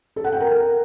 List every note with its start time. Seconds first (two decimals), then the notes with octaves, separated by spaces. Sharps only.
0.16 A4
0.24 F#5
0.32 G5
0.40 A#4